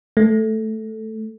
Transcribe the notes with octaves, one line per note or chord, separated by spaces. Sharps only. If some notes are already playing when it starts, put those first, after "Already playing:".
A3